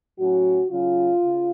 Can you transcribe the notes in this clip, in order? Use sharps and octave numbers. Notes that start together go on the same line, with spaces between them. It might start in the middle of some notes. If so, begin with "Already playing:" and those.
A2 F#3 C#4 F#4
C#3 F#3 C#4 F4
C#3